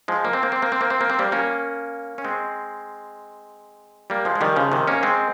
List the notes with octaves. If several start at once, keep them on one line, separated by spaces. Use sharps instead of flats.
F3 G#3
A#3
C4
A#3
C4
A#3
C4
A#3
C4
A#3
C4
G3 A#3
A#3 C#4
C#4
G#3 C4
G3 A#3
F3 G#3
G#3
D#3 G3
C#3 F3
C3 D#3
A#3 C#4
G#3 C4